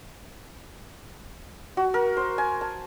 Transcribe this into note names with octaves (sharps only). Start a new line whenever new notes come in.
F#4
A#4
C5
G#5
A5